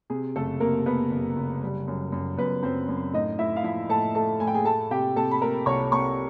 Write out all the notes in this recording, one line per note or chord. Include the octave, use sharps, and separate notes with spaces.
C3 G#4
F#1 A3 A4
C3 A#3 A#4
C3 B3 B4
F#1
F#1
G3
F#2
F#2
F#2 B3 B4
F#2 C4 C5
F#2
A2 D#4 D#5
A2 E4 E5
F5
F3 E4 E5
A2 A4 A5
A3 A4 A5
A2 G#5
G5
G#4 G#5
A3 A4 A5
C3 G4 G5
C3 A4 A5
B5
A3 A#4 A#5
C2 C#5 C#6
C3 C#5 C#6